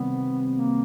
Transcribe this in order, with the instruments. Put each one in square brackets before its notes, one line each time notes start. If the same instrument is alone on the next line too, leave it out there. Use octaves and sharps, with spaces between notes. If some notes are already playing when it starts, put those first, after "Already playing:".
Already playing: [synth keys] C3 D#3 G3 C4 [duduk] B3
[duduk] A#3